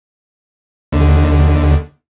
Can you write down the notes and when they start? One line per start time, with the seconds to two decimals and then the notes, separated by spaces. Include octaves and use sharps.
0.92 D#2 D3